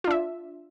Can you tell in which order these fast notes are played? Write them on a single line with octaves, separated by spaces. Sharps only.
F4 D4 E5